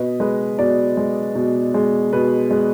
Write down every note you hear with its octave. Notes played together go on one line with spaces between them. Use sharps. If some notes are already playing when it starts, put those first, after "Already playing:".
Already playing: B2 B4 D#5
G#3 B4
B2 D5
G#3
B2
G#3
B2 B4
G#3